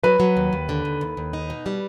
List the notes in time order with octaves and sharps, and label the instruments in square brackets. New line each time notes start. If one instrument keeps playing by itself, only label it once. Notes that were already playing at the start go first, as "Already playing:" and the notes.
[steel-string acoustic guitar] F#3 [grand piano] B4
[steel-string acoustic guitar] F#3
D#2
D#2
D3
D#2
D#2
D#2
D#4
B2
G3